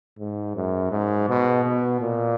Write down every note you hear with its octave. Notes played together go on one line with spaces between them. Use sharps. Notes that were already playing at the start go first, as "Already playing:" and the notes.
G#2
F#2
G#2
B2
B2
A#2